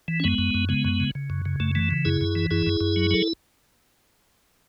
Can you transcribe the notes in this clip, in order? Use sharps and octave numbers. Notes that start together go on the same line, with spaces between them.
E3
C#4
F#2 G#3 B3
F#2
F#2
C#3 G#3 B3
F#2
C#3
C#3
F#2
C#3
F#2 A3
E3 A3
C#3
F#2 E4 G#4
F#2
E3
F#2 E4 G#4
F#2
F#2
F#3
F#3 A4